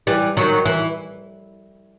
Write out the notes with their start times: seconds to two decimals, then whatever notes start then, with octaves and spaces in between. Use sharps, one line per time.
0.07 E3 G3
0.37 D#3 F#3
0.65 E3